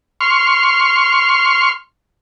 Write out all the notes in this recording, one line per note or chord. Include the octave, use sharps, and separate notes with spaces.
C6 C#6 F6